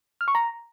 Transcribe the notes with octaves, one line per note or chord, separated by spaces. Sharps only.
F6
C#6
A#5